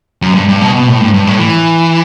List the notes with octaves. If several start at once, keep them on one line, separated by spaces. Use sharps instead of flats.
F#2
G2
G2
B2
B2
A2
G2
G2
A2
E3